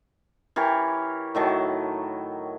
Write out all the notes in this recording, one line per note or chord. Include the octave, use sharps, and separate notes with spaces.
E3 G4 A#4 C#5
A2 D#3 F#3 A5